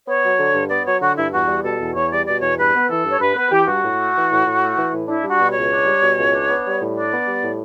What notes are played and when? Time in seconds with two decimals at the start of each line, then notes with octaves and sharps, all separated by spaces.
0.07 B3 C#5
0.23 F#3
0.39 D3
0.55 G2
0.70 B3 D5
0.85 F#3 C#5
1.01 D3 F#4
1.17 G2 E4
1.32 E2 F#4
1.48 G3
1.63 B2 A4
1.80 E2
1.95 E2 C#5
2.11 G3 D5
2.26 B2 D5
2.42 E2 C#5
2.58 G2 B4
2.74 B3
2.88 E3 A4
3.04 G2
3.11 C#5
3.20 G2 B4
3.35 B3 B4
3.52 E3 G4
3.67 G2 F#4
3.83 A2
3.98 A3
4.15 E3
4.30 A2
4.46 A2
4.61 A3
4.76 E3
4.92 A2
5.08 D4 E4
5.23 G3
5.29 F#4
5.40 B2
5.50 C#2 C#5
5.71 D4
5.86 G3
6.02 B2
6.18 C#2
6.33 D4
6.50 B3
6.65 G3
6.81 A2
6.96 D4 D5
7.11 B3
7.27 G3
7.43 A2